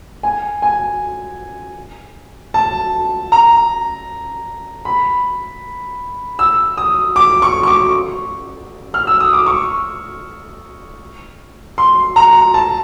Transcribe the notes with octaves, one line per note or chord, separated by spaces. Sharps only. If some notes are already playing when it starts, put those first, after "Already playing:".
G#5
G#5
A5
A#5
B5
E6
D#6
D6
C#6
C#6
D6
F6
E6
D#6
D6
C#6
C6
A#5
A5